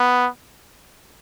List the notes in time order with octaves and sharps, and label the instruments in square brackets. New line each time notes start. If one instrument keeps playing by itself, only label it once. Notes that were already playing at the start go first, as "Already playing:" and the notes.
Already playing: [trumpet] B3